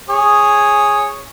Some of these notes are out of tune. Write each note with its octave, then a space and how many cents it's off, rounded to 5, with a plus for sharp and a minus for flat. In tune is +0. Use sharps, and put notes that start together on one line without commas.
G#4 -5 C#5 -5